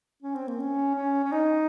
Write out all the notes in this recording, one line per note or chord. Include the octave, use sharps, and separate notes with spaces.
C#4
C4
A#3
C#4
C#4
C#4
D#4